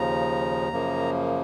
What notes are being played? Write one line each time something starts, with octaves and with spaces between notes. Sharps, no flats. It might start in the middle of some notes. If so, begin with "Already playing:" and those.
Already playing: D#2 C#3 F3 A#5
F#2 C#3 F3 A#3